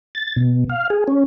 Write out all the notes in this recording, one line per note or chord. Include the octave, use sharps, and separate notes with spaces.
A6
B2
F5
G#4
C#4